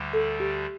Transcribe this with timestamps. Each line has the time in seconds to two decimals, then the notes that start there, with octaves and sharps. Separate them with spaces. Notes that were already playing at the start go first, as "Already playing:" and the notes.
Already playing: D2 D3 G3
0.13 A4
0.40 G4